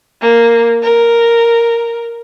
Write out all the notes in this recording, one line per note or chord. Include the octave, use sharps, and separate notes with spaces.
A#3
A#4